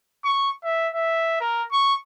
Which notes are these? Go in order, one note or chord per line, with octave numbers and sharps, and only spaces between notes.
C#6
E5
E5
A#4
C#6